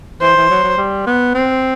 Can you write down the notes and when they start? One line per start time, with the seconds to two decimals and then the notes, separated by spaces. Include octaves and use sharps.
0.21 E3 C5
0.36 E3
0.50 F#3
0.63 F#3
0.77 G3
1.06 B3
1.34 C4